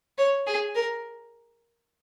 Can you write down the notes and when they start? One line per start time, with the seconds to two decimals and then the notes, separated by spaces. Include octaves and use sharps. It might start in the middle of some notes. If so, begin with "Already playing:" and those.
0.18 C#5
0.47 G#4
0.75 A#4